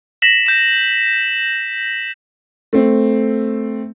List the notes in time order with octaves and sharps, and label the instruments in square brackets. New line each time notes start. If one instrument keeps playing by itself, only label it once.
[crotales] A#6 B6 E7 F#7
G6 E7
[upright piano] A3 C4